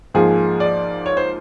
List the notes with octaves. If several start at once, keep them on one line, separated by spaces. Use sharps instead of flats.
G#2 F3 A#3 G#4
D5
C#5
C5